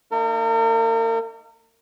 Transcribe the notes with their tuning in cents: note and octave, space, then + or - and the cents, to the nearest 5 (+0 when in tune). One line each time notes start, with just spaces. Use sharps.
A#3 -40 D#4 +0 A#4 -40